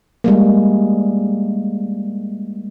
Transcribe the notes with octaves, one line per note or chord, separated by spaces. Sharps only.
G3 G#3 A#3